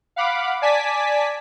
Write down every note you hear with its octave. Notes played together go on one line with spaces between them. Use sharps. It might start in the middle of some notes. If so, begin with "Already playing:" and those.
F5 F#5 B5 D6
D5 G#5 A5 D6 B6